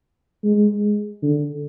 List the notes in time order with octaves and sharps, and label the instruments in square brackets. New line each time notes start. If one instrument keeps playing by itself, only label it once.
[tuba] G#3
D3